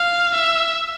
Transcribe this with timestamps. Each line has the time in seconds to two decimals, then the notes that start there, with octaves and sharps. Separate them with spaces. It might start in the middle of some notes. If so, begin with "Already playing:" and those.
Already playing: F5
0.34 E5